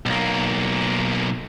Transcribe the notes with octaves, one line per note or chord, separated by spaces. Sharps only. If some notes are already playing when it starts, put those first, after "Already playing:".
B1 A#3